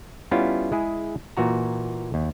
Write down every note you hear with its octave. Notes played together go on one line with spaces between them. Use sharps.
G3 B3 C#4 E4 F4
G#3 E4 G#4
A#2 E3 F#4 A#5
D#2